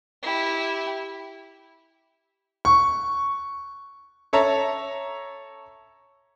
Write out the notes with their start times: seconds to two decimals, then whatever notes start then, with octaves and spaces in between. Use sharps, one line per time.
0.23 E4 G4
2.65 C#6
4.33 A4 C#5 E5 A5 A#5